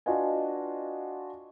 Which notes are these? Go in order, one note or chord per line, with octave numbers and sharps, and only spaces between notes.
D4 F4 F#4 B4 D#5 G#5